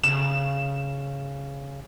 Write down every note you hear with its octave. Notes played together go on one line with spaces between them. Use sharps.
C#3 E7